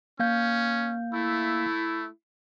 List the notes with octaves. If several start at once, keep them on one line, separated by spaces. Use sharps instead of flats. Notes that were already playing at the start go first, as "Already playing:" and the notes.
A#3 C#4 F5 G6
A3 E4